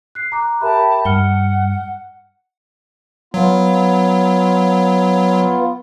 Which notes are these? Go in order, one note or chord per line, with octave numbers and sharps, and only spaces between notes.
F#6 C7
A#5 D6 F#6
G4 A#4 E5 A5 B5
G2 F#5 F6 C#7 G7
F#3 B3 F4